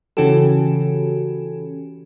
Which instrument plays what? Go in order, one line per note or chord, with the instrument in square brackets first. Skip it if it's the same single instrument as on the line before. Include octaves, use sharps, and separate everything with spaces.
[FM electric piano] C#3 E3 C#4 F#4 G4 A4